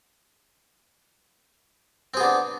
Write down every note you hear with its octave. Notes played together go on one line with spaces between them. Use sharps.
B3 C4 D4 G#4